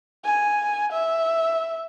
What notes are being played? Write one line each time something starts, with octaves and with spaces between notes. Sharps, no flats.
G#5
E5